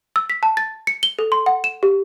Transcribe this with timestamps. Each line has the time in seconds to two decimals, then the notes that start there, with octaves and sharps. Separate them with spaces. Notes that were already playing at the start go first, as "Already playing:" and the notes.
0.16 E6
0.30 B6
0.43 A5
0.57 A6
0.87 C#7
1.03 G7
1.19 A4
1.32 C6
1.46 F#5
1.64 E7
1.83 G4